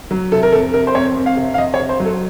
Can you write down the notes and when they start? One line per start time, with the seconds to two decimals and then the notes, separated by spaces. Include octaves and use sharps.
0.11 F#3
0.32 C3 A4
0.43 A#4
0.52 F2 A4
0.73 C3 A#4
0.87 C5
0.95 F2 C#5
1.16 F2
1.26 F5
1.37 C3
1.54 F5
1.58 F2 D#5
1.74 C#5
1.79 C3
1.89 C5
2.00 F#3
2.05 A4